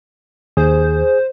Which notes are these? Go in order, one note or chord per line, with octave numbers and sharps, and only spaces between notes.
D#2 G#4 C5